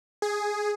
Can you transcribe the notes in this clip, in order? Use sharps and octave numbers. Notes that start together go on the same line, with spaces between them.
G#4